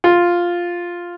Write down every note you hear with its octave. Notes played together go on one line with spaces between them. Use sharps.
F4